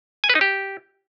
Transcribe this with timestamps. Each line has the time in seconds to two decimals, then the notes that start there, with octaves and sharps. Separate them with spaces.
0.24 G#5
0.30 B4
0.35 D#4
0.41 G4